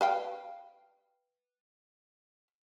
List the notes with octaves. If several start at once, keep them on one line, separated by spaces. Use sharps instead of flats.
B4 F5 G5